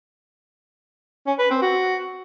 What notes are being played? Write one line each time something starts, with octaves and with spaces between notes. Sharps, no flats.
C#4
B4
C4
F#4